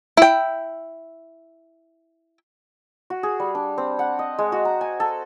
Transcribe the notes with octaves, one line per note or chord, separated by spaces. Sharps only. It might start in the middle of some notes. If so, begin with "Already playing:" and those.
E4 G5
F#4
G#4
G3
D4
C4
F#5
D#5
G#3
F#4
A#5
G#5
A4